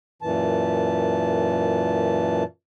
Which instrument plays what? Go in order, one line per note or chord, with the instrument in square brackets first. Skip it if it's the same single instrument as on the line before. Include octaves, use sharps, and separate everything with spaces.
[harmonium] F#2 A#2 E3 A5